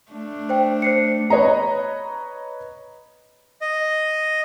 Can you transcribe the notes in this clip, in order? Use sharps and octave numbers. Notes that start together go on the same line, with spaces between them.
A3 D4
C5 G5
C5 C7 C#7
B4 C#5 D#5 A#5
D#5